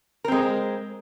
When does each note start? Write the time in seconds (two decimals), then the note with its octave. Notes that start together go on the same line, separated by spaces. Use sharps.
0.24 A#4
0.28 C4
0.32 G#3